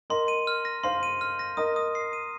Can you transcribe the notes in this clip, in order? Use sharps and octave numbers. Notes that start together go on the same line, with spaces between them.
A#4 D#5 C6
D#7
F6
A#6
C5 F5 C6
D#7
F6
A#6
A#4 D#5 D#6
D#6
C7
D#7